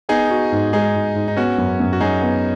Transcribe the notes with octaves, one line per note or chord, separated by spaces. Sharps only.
B3 D#4 G#4
F#4
G#2
G#3 D#4 G#4
G#2
G#2
D#4
B3 C#4 F#4
F#2
F#2
F#4
F#3 D#4 G#4
B3